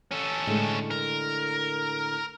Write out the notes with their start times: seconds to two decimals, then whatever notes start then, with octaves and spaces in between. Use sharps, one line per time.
0.12 C#4 A4
0.47 A2 D3 G#3
0.91 A#4